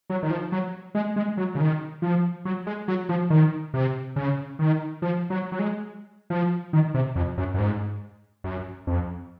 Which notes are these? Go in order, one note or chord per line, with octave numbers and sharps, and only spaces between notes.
F#3
D#3
F3
F#3
G#3
G#3
F#3
C#3
D#3
F3
F#3
G#3
F#3
F3
D#3
C3
C#3
D#3
F3
F#3
F#3
G#3
F3
D#3
C3
F2
F#2
F#2
G#2
F#2
F2